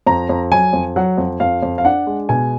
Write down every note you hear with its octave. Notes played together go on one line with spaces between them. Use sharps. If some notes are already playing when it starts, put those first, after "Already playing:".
F2 A#5
F2
F#3 G#5
F2
F#3 F#5
F2
F2 F5
F2
F5
D4 F#5
G#3
B2 G#5